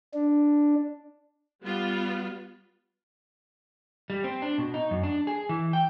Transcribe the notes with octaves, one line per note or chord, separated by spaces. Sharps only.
D4
G3 B3 F4
G3
C4
D4
B2
D#4
F#2
D4
G#4
E3
G5